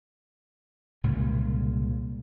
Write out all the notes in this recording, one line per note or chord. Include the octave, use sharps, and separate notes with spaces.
C2 A#2 C#3 G#3